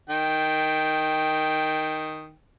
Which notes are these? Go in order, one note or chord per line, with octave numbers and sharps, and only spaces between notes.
D#3 G5